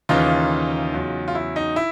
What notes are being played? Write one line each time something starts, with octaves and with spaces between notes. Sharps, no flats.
D#2 C#3 E3 D#4 F4
E2 C#3 F#3
F4
E4
D#4
E4